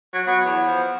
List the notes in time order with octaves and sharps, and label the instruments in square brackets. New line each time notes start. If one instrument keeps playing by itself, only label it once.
[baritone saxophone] F#3
[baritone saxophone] F#3 [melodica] B3
[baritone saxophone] E2
F3